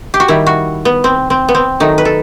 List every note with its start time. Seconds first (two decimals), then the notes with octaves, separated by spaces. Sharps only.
0.14 G4
0.20 F#4
0.28 D#3 G3 E4
0.46 F#4
0.85 B3
1.04 C4
1.30 C4
1.49 B3
1.55 C4
1.80 D#3 F#3 A3 D#4
1.98 B4
2.05 A4